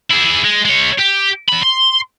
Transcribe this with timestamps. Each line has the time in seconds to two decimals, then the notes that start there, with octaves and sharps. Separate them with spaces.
0.10 E4 G#4
0.44 G#3
0.65 G#3 C#5
1.00 G4
1.48 E2 B5
1.63 C6